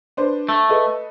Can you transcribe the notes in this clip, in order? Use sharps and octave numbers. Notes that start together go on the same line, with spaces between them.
D4 B4 C5
A3
A4 B4 D#5